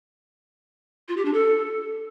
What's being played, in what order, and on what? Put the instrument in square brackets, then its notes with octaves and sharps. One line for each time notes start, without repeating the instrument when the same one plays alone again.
[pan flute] F4
G4
D4
A4